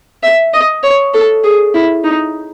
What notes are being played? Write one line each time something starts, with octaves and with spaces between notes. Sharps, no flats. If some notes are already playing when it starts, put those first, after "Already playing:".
E5
D#5
C#5
A4
G#4
E4
D#4